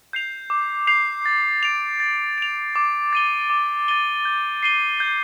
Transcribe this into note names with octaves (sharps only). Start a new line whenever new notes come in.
G6 C7 F7
D6
G6 C7 F7
A6
D7 F7
A6
D7 F7
D6
A6 D#7 G7
D6
A6 D#7 G7
G6
C7 D#7 G7
G6